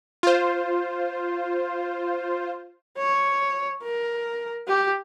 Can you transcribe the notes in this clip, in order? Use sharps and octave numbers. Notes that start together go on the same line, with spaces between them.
F4 C5
C#5
A#4
G4